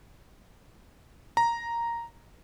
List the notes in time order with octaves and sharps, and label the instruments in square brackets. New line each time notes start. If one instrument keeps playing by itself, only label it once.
[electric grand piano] A#5